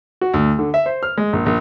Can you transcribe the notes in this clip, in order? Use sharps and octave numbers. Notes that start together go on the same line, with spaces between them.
F#4
D2
D3
E5
C5
F6
G#3
A#1
A#1